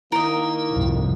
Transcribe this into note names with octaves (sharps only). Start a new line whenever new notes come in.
D#3 A#3 E4 A#4 D#5
C2 F2 G#2